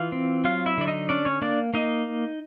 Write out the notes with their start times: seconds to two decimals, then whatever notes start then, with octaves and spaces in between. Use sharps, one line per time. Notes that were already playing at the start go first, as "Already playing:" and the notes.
Already playing: E3 F4 F5
0.12 C4
0.44 F#3 F4 F5
0.66 E4 E5
0.78 D3 D5
0.87 D#4 D#5
1.09 C#4 D4 D5
1.25 C#4 C#5
1.42 A#3 D4 D5
1.74 A#3 D#4 D#5